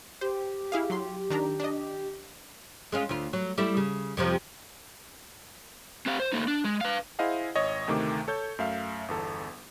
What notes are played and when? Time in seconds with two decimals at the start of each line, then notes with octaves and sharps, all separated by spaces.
0.21 G4 C5
0.72 E4 G#4 F5
0.90 F#3 C6
1.30 D#3 D4 A#5
1.60 D4 D#5
2.92 G#3 C#4 F4
3.09 D2 F4
3.33 F#3
3.58 G3 A3 E4
3.77 C#3
4.17 F2 C3 F3
6.06 C4 G4 F5
6.20 C5
6.32 A3 A#3 D#4
6.48 D4
6.65 G#3
6.81 B4 F5
7.19 E4 G#4 C5 D#5 F5 F#5
7.55 G#1 C#5 D#5
7.88 D2 C3 D#3 A3 D6
8.28 A4 C#5 G6
8.59 F#2 A3 E5 F5
9.08 G1 E2 A4